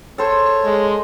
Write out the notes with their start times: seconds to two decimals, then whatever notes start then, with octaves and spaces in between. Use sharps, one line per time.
0.18 A4 C5 C#5
0.64 G#3